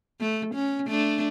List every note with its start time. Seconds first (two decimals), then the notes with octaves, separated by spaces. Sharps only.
0.20 A3
0.55 C#4
0.87 A3 D4